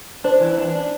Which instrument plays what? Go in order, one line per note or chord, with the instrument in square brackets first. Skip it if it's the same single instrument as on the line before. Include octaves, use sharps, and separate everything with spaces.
[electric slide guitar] D4 [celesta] C5
[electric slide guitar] E3
D4
D4